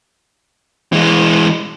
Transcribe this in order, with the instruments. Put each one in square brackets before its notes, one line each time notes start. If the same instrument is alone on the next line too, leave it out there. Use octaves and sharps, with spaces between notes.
[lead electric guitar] E3 G#3